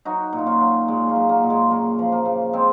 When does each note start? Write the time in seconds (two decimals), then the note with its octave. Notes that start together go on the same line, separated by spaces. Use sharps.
0.05 F#3 D#4 F#4
0.33 A#2
0.38 D#4
0.46 C#4 F4
0.61 F#3
0.88 A#2 G#3
1.09 A#3
1.16 F#3
1.29 A#3
1.43 A#2
1.50 G#3
1.70 F#2 A#3
1.99 F3
2.12 A#3
2.25 C#3
2.53 G#3 C4